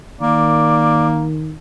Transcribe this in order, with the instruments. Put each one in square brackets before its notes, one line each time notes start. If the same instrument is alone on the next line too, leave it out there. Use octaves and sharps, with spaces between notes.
[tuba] D#3 [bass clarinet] A#3 [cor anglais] D5